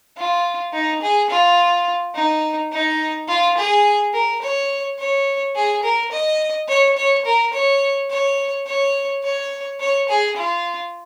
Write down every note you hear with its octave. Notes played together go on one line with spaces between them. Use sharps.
F4
D#4
G#4
F4
D#4
D#4
F4
G#4
A#4
C#5
C#5
G#4
A#4
D#5
C#5
C#5
A#4
C#5
C#5
C#5
C#5
C#5
G#4
F4